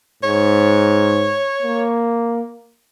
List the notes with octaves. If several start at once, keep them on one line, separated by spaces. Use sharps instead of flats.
G#2 C#5
A#3